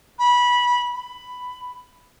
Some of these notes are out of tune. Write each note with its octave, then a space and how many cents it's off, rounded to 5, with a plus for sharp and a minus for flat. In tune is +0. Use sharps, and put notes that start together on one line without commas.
B5 -20
B5 +10